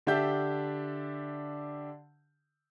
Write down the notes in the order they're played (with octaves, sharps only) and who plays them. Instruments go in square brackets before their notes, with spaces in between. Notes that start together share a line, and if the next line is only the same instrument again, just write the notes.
[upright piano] D3 D4 G4 E5 G6